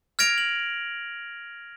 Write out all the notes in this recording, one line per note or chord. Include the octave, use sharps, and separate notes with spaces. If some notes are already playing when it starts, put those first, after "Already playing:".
F6 G#6 A#6 D7 F7
F#7